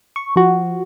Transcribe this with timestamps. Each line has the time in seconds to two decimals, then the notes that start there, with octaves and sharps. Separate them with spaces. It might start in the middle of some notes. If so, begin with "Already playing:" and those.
0.16 C#6
0.36 F3 F#4